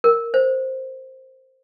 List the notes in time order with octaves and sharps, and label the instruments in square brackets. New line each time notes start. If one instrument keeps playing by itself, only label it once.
[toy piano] A#4
C5